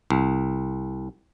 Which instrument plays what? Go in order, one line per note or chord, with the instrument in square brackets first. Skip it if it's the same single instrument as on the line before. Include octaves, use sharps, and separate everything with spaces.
[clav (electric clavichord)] C2